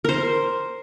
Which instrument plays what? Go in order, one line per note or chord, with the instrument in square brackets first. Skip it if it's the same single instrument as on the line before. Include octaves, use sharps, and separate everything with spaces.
[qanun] A#4 C5